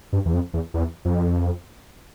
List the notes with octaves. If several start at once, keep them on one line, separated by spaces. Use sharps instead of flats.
G2
E2
F2
E2
E2
F2